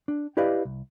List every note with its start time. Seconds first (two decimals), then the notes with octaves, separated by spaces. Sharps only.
0.08 D4
0.37 E4 G4 B4 D5 D#5 F5
0.65 C2